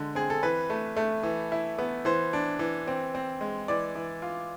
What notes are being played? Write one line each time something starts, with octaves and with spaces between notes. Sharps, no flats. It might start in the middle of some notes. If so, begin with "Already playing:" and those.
Already playing: D3 G#3
C4 G#4
A4
E3 B4
A3
A3
E3
E4
B3
E3 C5
D4
E3
C4
C4
G#3
E3 D5
E3
F4